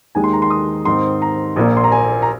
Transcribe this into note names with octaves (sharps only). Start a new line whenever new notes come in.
D#2 D#3 G#3 G#5
C6
A#5
C6
D#6
G#2 D#3 C4 C6
A#5
A#1 A#2 A#3
C6
A#5
G#5
A#5